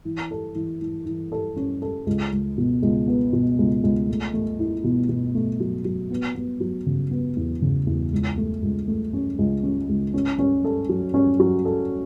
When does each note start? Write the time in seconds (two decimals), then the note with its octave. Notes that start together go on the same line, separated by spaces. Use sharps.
0.05 E3
0.31 A4
0.55 E3
0.81 E3
1.06 E3
1.32 A4
1.56 C#4
1.82 A4
2.06 C#2
2.32 C#2
2.58 B2
2.82 C#2
3.08 B3
3.33 B2
3.58 C#2
3.83 C#2
4.08 A3
4.33 A3
4.59 E4
4.84 B2
5.09 B2
5.34 A3
5.60 F#3
5.85 F#3
6.11 B3
6.35 B3
6.60 F#3
6.86 C#3
7.11 B3
7.37 E2
7.62 C#3
7.87 E2
8.12 C#2
8.37 A3
8.62 C#2
8.88 A3
9.13 C#4
9.38 C#2
9.63 C#4
9.89 C#2
10.14 C#4
10.39 C#4
10.64 A4
10.89 F#3
11.14 C#4
11.39 F#3
11.65 A4